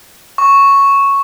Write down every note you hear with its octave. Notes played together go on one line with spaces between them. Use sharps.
C#6